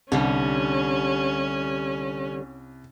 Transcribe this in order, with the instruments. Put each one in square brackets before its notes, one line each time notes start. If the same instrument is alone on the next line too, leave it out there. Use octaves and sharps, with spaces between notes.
[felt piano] C2 [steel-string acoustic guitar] D3 G3 [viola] C#4